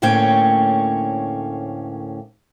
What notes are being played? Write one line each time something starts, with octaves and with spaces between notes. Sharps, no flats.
D2 A2 A#3 C#4 C#5 G5